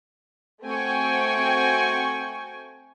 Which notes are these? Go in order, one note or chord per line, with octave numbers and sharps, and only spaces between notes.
A3 C4 F#4 G5 G#5 C#6